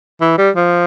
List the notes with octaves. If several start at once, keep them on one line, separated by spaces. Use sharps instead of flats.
E3
G3
F3